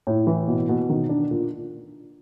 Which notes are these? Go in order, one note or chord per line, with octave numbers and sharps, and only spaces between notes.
A2
E3
B2
B2
D#3
D4
A#2